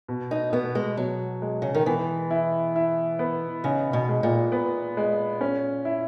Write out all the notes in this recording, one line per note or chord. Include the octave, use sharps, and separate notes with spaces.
B2
D#4
B2 B3
G#3
B2 F#3
G#3
C#3
D#3
E3 B3
E4
E4
B3
C#3 D#4
B2
G#3
A#2
B3
G#3
C#4
E4